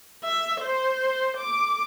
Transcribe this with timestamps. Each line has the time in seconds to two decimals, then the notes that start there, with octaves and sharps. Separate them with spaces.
0.23 E5
0.61 C5
1.37 D6